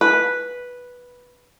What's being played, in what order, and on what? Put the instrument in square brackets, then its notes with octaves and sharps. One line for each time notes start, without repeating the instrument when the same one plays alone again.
[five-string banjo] B4